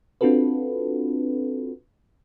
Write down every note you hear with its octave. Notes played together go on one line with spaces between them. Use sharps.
C4 D4 F4 F#4 A4 B4